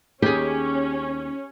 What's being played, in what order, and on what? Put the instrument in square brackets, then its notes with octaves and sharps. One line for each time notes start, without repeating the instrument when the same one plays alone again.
[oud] D#2 G#4 [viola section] C#4 [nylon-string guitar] G4